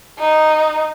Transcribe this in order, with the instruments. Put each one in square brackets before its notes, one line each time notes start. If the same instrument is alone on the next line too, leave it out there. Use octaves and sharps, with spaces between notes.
[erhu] D#4